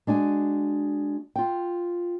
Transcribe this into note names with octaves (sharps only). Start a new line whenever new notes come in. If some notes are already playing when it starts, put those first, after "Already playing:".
G#3 D4 F#4 G#5
F4 G5